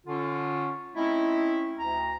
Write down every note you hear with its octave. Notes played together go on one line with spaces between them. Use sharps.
D3 C#4 F4
A3 C4 C#4 D#4 E4
D2 A#5